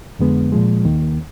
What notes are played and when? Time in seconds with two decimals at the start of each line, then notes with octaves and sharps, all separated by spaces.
0.19 F2 D3 G#3 B3
0.52 A#2 F3 G#3
0.85 D#2 D#3 A#3